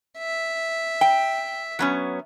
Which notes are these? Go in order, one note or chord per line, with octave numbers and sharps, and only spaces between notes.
E5
G5
F#3 B3 C#4